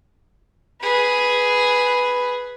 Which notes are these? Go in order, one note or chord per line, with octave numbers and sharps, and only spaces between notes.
G#4 B4